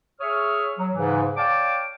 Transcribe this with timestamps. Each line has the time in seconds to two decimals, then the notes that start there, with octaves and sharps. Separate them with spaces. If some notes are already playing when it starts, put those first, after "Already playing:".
0.20 G#4 C#5 E5 C#6 D#6 F6
0.79 F#3
0.93 G#2 C#3 E3
1.36 C#5 D5 F5 G5 A5 D6